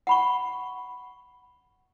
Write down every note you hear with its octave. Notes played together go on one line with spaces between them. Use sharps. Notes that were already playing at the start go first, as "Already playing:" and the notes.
F#5 B5 C#6